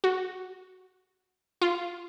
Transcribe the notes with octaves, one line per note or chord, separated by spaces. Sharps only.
F#4
F4